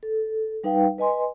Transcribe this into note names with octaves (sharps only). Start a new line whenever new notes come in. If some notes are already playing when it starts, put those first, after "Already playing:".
A4
G3 D#4 B4 F5 G5
B4 D#5 G#5 C6